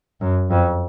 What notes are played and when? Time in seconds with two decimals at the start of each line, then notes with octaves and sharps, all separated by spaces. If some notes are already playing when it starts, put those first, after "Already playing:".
0.21 F#2
0.50 F2